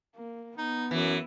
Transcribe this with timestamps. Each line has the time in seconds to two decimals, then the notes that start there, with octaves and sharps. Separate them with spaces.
0.16 A#3
0.58 B3 D#4
0.91 F#2 E3